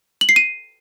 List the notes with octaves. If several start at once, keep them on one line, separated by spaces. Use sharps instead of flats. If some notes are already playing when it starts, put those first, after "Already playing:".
F#7
C7
D#7